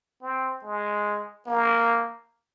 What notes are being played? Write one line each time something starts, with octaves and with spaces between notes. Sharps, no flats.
C4
G#3
A#3